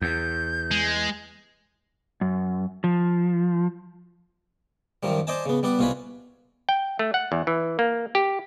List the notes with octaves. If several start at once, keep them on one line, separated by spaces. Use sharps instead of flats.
E2 G6
G#3
F#2
F3
F#2 D#3 F3 G3
C5 D5 D#5 G#5 A5
C#3 B3
G3 B3 D5 F#5
C2 B2 F4 F#4 G#5 B5
G5
A3
F#5
E2
E3
A#3
G4